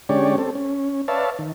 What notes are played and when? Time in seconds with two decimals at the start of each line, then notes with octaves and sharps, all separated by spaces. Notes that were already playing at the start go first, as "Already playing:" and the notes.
0.09 D3 G#3 C#4 G4 C#5 D5
0.38 C4 A4
0.55 C#4
1.08 B4 C#5 D5 E5 F5 A5
1.39 D#3